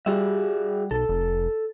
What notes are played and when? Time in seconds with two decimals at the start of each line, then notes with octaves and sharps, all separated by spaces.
0.06 G3 F#4 G#4 E5
0.91 B1 A4
1.09 F1